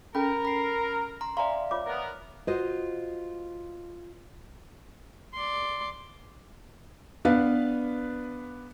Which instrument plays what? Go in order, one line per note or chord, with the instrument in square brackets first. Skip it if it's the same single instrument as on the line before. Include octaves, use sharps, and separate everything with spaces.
[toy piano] C#4 A4 [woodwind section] A#4 [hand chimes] G5 B5
[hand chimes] B5 C7
A#5 C6
[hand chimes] D5 E5 F5 [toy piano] G#5 A#5 C6
[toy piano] F4 C#5 D6
[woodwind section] B3 A#4
[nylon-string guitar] F4 F#4 C5 D#5
[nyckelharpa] D5 C6
[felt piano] B3 D4 B4 F5